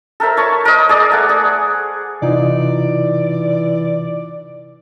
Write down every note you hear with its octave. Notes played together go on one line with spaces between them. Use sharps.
A4 A#4 C5 E5
C#5 A5 C#6
A#4 C5 D#5
G#4 D5
A3 F#5
G#4
C3 E3 D#4 F4 D5